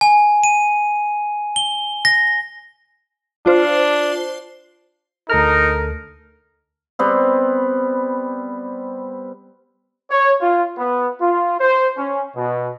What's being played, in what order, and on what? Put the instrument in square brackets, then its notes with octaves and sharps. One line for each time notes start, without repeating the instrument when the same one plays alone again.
[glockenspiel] G#5
D#7
G7
A#6
[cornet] D4 [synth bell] F4 C5
[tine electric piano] D2 A4 F6 [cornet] D#4 [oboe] A#4
[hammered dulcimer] G3 B3 C4
[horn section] C#5
F4
B3
F4
C5
C#4
B2